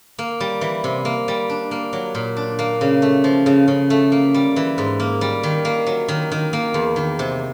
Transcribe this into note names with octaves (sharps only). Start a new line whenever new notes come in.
A#3
G3
E3
C3
A#3
G3
D4
A#3
F#3
A#2
D4
A#3
C#3
A3
F3
C#3
C#3
A3
A#3
G3
E3
G#2
A#3
G3
D#3
A#3
F#3
D#3
D#3
A#3
E2
D#3
C3